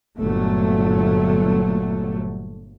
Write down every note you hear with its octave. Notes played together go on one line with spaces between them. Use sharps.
G1 A#2 F#3 A3